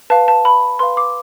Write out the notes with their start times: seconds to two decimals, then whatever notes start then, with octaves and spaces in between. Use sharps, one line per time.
0.10 B4 F5 A5
0.28 A5
0.45 B5
0.79 B4 F5 C6
0.97 D6